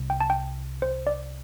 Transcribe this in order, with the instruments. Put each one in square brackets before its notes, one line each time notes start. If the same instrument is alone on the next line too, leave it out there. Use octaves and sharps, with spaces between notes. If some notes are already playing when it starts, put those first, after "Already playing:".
Already playing: [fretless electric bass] C2 C3
[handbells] G5
A5
G5
C5
D5